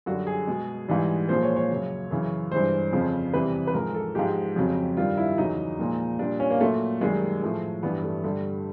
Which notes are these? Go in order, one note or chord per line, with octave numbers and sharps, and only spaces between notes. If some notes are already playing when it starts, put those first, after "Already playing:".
F#2 D3 G3 F#4
G#4
B2 G#3
G#2 E3 G3
A#2 F3 G#3 C5
C#5
C#5
F#2 C#3 F#3
F#2 C#3 E3
G2 E3 G#3 C5
F2 C#3 F3
E2 C3 E3 G3 B4
B4
G#2 F3 G#3 A#4
A4
G#2 F3 G#3 G4
F2 C#3 F#3
G2 D#3 G3 F4
E4
E2 C#3 F#3 D#4
A#2 F3 G#3
A#2 G3 D4
C#4
A#3
A#2 F#3 A3
F#2 D#3 G3 G#3
A2 F3 G#3 A3
G2 E3 G3 B3
A3
G2 D3 G3